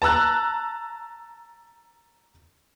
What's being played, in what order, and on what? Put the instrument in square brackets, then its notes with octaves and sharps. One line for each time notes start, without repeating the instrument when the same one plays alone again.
[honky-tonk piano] A5 A#5 E6 F#6